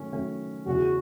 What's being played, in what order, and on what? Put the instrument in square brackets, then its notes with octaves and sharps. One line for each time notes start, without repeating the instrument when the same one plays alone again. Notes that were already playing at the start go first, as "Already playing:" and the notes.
Already playing: [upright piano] D#3 F#3 A3 C#4
D#3 F#3 A3 C#4
[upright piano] E2 C#3 E3 [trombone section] F#4